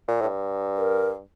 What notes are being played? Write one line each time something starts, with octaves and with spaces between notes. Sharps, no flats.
A#2
A2
G2
A#4